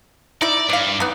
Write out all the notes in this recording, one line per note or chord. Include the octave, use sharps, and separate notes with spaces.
D#4 E4 D5 E5
G2 D5 F5
B3 D#4